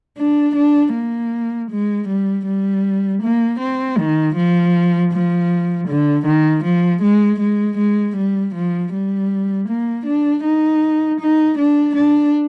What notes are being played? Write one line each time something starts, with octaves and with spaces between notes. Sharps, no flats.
D4
D4
A#3
G#3
G3
G3
A#3
C4
D#3
F3
F3
D3
D#3
F3
G#3
G#3
G#3
G3
F3
G3
A#3
D4
D#4
D#4
D4
D4